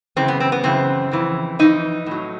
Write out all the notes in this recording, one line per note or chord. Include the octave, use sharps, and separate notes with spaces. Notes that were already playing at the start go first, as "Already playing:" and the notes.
F#2 C#3 E3 C4
B3
C4
B3
F#2 C#3 E3 C4
F2 C#3 E3
F2 C#3 E3 D#4
A2 F#3